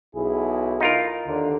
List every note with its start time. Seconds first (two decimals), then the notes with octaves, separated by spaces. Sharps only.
0.15 B1 E4 G#4
0.80 D#4 F4 A#4
1.26 D#2 D3